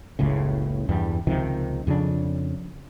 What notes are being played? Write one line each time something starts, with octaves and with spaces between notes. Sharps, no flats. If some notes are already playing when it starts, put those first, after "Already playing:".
F#1 C#2 A2 C#3
E2 G2 G3
C#2 C3 D#3 F3
F2 C#3 A#3 D4